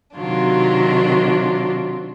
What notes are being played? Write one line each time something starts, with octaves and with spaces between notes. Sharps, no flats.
C3 D#3 F#3 D4 F4